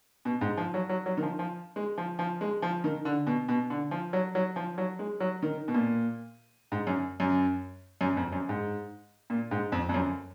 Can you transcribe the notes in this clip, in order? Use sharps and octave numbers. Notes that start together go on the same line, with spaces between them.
B2
G#2
F3
F#3
F#3
F#3
D#3
F3
F3
G#3
F3
F3
G#3
F3
D#3
D3
B2
B2
D3
F3
F#3
F#3
F3
F#3
G#3
F#3
D#3
B2
A#2
G#2
F#2
F#2
F#2
F2
F#2
G#2
A#2
G#2
F2
F2
F#2